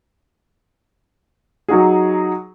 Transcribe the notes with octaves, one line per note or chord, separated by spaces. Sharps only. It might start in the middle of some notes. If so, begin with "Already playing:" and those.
F#3 D#4 F#4 G#4